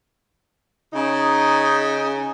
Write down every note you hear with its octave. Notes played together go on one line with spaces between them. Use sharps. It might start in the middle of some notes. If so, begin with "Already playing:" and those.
C#3 D#4